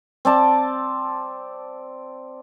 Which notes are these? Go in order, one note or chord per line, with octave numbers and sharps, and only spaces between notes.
C4 D5 A5